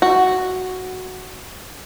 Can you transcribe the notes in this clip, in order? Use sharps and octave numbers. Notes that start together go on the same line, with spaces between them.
F#4